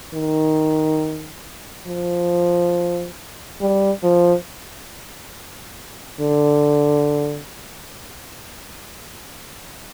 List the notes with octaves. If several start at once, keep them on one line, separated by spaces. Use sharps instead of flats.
D#3
F3
G3
F3
D3